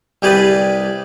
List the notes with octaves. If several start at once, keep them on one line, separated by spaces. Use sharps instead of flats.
C2 G4 G#4 B4 D5